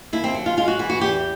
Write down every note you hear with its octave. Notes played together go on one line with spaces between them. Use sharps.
D#2 E4
C4
F#3
F4
G#3 F4
F#4
E3
F#4
E2 G4